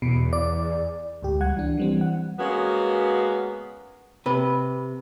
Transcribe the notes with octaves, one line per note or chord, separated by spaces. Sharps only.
E2 B2
D5
D2 G#2 G4
C#2 G3 F#5 G#6
E3 D4
E3 G3 C4
F#5
G#3 A#3 B3 C#4 F#4
C3 B4